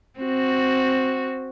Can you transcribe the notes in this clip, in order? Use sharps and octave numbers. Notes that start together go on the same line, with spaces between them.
C4 F#4